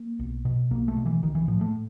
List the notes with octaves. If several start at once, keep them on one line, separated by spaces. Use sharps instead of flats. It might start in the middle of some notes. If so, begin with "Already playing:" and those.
Already playing: A#3
B1
B2
B1 A#3
A3
B2
E3
B1 D#3
E3
A2 F3
A3